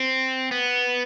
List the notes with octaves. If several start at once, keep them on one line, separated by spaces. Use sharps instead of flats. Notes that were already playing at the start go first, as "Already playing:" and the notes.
Already playing: C4
B3